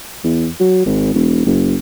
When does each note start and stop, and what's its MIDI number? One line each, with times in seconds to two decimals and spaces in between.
0.24 0.48 40
0.60 0.82 54
0.86 1.11 32
1.14 1.41 28
1.46 1.76 30